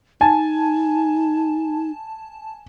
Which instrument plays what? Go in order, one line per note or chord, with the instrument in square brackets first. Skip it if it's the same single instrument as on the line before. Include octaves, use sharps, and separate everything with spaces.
[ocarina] D#4 [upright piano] G#5 [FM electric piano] A5